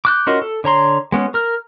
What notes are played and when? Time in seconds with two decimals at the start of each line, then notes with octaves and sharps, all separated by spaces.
0.05 D6 F#6 G6
0.27 C#4 F4 F#4 A#4 D#5
0.42 A4
0.64 D3 C#5 A#5 C6
1.12 G#3 B3 C#4
1.34 A#4 F6